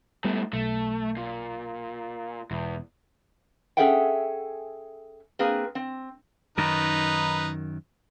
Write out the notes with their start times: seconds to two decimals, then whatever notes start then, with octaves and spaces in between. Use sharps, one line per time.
0.24 G#2 G3 A3 B3
0.53 B1 A3
1.16 A#2
2.51 E1 E2
3.77 C#4 G#4 A4 E5 F#5 G5
5.39 A#3 C4 G#4 B4
5.75 C4
6.58 F#2 D#3 D#4 B4